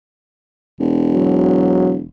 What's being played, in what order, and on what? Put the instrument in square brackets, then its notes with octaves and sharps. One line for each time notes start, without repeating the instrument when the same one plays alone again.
[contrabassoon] E1
[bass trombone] F#3